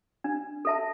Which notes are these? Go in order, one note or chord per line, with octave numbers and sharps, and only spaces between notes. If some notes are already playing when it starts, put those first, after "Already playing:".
D4
A4 E5 A5